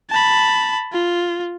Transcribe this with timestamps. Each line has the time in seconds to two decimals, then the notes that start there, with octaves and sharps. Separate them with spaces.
0.10 A5 B5
0.92 F4